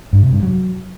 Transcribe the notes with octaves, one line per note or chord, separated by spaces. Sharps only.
G2
C3
G2
F#3